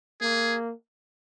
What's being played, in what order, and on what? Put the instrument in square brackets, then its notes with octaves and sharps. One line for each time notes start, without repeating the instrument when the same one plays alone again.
[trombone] A#3 [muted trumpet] G#4